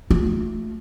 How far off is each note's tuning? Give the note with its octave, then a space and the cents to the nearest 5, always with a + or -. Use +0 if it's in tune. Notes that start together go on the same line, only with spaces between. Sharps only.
A3 +0 F4 +45